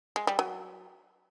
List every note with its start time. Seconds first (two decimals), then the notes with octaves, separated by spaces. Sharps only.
0.16 G#3
0.27 G3
0.39 F#3